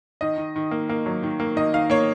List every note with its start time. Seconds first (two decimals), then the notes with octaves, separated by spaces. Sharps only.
0.21 D#3 D#5
0.38 D#3
0.56 D#3
0.71 A#3
0.89 A#3
1.06 F#3
1.23 D#3
1.40 A#3
1.56 D#3 D#5
1.73 D#3 F5
1.90 A#3 C#5